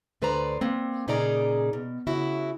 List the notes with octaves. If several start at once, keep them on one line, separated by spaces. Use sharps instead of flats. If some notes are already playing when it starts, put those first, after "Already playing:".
D2 D3 B4 C5 D5 A#5
A#3 C4
A#2 C#3 D#4 G#4 D5 A#5
B2
C#3 E4 F#4